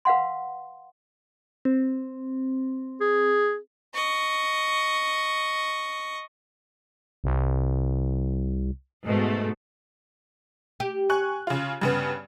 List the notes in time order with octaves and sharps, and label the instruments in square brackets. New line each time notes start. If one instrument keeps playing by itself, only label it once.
[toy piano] B4 F5 F#5 C6
[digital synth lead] C4
[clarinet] G#4
[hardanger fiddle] D#5 C#6
[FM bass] C2
[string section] G#2 B2 A3
[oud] G4
[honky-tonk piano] G#5 C#6 F#6
C#3 F4
G2 C#3 B3